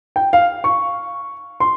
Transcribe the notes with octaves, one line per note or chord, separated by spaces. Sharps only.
G5
F5
C#6
C6